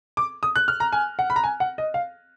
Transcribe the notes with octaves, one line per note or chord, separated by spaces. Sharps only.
D6
D#6
F#6
F6
A#5
G#5
F#5
B5
A#5
G#5
F#5
D#5
F5